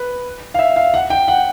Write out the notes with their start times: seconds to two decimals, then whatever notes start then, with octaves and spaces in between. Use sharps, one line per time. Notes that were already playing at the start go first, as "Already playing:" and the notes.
Already playing: B4
0.54 F5
0.59 E5
0.76 F5
0.94 F#5
1.10 G5
1.28 F#5